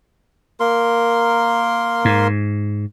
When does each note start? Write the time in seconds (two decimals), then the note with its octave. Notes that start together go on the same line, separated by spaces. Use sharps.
0.60 A#3 A#4 C6
2.05 G#2